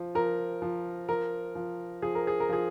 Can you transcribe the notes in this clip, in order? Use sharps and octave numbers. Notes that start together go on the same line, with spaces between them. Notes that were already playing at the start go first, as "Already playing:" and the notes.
Already playing: F3
F3 A#4
F3
F3 A#4
F3
F3 G#4
A#4
G#4
A#4
F3 G#4